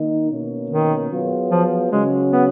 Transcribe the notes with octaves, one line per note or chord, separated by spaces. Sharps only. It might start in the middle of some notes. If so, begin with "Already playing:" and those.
Already playing: D#3 A#3 D#4
B2 A#3 C#4
D#3
F#3 B3 F4 G#4
F3
C#3 F#3 G#3 C#4
B3